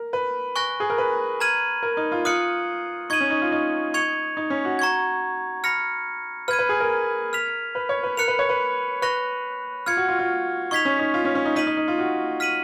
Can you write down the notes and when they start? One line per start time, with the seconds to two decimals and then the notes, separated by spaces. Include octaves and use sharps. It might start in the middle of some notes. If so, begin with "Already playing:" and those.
Already playing: A#4
0.13 B4
0.56 G#5 C#6 F#6 A#6
0.80 G#4
0.90 A#4
0.98 B4
1.40 A#5 F6 G#6 D#7 F#7
1.83 A#4
1.97 D#4
2.12 F4
2.25 F4 D#6 F#6 C#7 F#7
3.10 D#4 C#6 G#6 D#7 F#7
3.20 C#4
3.30 D#4
3.42 F4
3.52 D#4
3.94 C#6 G#6 C#7 F7
4.37 D#4
4.50 C#4
4.65 F#4
4.79 A#5 C#6 G#6
5.64 B5 F6 A#6 C#7
6.48 B4 F6
6.51 G#6 D#7
6.59 B4
6.69 G#4
6.80 A#4
7.33 F6 B6 F7
7.75 B4
7.89 C#5
8.03 B4
8.17 A#4 F#6 C#7 F7
8.28 B4
8.39 C#5
8.49 B4
9.02 B4 C#6 F#6 A#6 F7
9.86 F4 F6 G#6 C#7
9.97 F#4
10.09 F4
10.19 F4
10.71 D#4 C#6 G#6 B6 F7
10.85 C#4
10.99 D#4
11.14 F4
11.25 C#4
11.35 C#4
11.45 D#4
11.56 D#4 F6 B6 D#7 F#7
11.67 D#4
11.77 D#4
11.88 F4
11.99 F#4
12.40 F6 B6 D#7 F#7